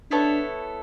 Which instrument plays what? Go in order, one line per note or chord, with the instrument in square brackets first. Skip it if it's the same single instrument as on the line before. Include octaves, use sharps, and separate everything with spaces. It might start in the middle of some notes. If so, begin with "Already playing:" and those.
[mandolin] B3 E4 A4 C#5 [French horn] D4